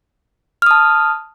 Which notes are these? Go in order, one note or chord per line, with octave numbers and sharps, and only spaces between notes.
A5 D#6 F6